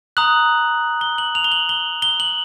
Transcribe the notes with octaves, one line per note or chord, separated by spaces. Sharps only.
A#5 D#6 F#6 F#7
G7
F#7
F7
G7
F#7
G7
G7
F#7